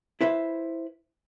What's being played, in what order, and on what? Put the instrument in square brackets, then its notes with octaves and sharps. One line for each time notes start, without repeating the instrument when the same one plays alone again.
[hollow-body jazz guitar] E4 B4 C5 E5